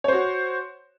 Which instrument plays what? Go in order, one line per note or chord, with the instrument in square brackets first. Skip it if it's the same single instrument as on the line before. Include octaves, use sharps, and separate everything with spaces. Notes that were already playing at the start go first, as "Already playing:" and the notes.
[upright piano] C#5
C5
F#4